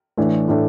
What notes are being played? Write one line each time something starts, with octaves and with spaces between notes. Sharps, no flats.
A2 E3 A3 D4
A2 E3 A3 D4